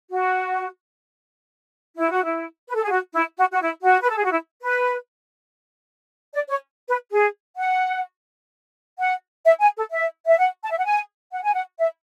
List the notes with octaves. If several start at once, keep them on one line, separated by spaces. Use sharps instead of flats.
F#4
E4
F#4
E4
B4
A4
G#4
F#4
E4
F#4
F#4
E4
F#4
B4
A4
G#4
F#4
E4
B4
D5
C#5
B4
G#4
F#5
F#5
E5
G#5
A4
E5
E5
F#5
A5
E5
F#5
G#5
F#5
G#5
F#5
E5